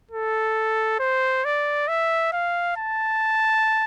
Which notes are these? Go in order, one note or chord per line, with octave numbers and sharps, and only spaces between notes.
A4
C5
D5
E5
F5
A5